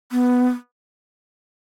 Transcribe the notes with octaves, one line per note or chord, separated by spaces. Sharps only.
B3